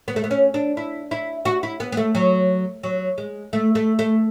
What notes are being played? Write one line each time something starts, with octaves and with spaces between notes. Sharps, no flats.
B3
A3
B3
C#4
D4
E4
E4
F#4
E4
B3
B3
A3
F#3
F#3
G#3
A3
A3
A3